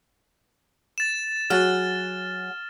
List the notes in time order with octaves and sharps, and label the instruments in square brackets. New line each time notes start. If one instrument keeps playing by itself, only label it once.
[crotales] A6 E7
[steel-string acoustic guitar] F#3 G#4 F#5 [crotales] F6 A6